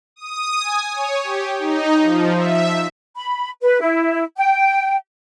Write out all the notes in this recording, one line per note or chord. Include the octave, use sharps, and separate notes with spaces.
D#6
G#5
C#5
G4
D#4
F3
E5
B5
B4
E4
G5